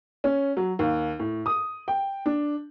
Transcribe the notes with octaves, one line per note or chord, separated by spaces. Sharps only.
C#4
F#3
D#2
A2
D#6
G5
D4